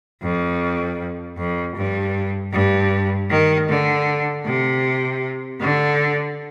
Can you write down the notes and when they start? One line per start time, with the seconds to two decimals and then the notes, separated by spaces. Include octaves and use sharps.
0.22 F2
1.37 F2
1.76 G2
2.52 G2
3.30 D#3
3.69 D3
4.45 C3
5.60 D3